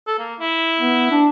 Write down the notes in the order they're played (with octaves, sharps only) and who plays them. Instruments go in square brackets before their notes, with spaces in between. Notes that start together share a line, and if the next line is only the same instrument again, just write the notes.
[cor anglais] A4
A#3
E4
[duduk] B3
D4